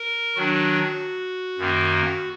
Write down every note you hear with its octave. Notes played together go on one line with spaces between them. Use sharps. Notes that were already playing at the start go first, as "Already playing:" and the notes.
Already playing: A#4
D#3 F#3 D4 F#4
F#2 D#3 A#3